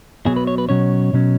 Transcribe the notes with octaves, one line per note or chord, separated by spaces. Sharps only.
B1 B2 F#3 G#4
B4
C#5
B4
B2 F#3 C#4 C#5
B2 F#3 C#4